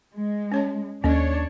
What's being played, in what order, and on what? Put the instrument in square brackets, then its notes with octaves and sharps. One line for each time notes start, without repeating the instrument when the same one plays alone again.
[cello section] G#3
[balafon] C#4 C#5 A5
[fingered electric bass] D#2 A#3 [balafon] C#4 A4 D#5 [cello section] D4 C#5